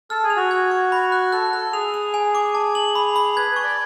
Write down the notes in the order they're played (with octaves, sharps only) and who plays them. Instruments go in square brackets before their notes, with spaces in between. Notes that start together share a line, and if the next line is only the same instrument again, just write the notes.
[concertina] A4 [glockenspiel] F6
[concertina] G#4
[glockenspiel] F7
[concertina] F#4
[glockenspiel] G#6
C#6
B5
F#6
[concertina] A4 [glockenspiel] F#6
[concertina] A4 [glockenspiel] F#6
[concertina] G#4 [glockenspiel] F7
[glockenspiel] F7
G#5
D6
A5
F#7
B5
B5
[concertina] B4 [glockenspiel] G#6
[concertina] B4
[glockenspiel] C#6
[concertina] D5